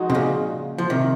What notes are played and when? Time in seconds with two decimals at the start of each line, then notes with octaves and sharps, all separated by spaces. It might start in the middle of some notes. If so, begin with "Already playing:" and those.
Already playing: F3 G#3 D#4 F#4
0.10 C3
0.15 A#2 C#3
0.78 F3
0.90 C3 D#3